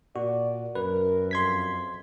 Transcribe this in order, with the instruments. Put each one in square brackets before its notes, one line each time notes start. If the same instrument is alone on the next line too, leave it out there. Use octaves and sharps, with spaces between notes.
[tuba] A#2 [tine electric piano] F#4 [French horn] D5
[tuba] F#2 [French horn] A#4 [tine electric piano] B4
[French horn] F2 [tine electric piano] C6 G#6 B6